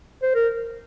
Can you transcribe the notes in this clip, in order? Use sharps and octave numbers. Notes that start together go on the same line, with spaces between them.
C5
A#4